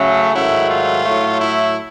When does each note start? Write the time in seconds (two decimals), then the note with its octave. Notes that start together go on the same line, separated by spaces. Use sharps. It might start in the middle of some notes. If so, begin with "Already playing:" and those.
Already playing: C#3 F#3 A3
0.35 G#2 D#3 F#3 A3 E4
0.70 F4
1.05 A2 F#3 A3
1.40 E4